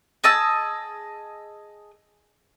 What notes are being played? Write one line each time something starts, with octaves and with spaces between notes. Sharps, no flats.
G#4 D#5 A5 E6